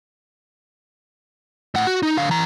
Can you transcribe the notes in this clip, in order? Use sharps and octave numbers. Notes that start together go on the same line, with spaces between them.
A2 F#5
F#4
D#4
D3 F5
E3 A#5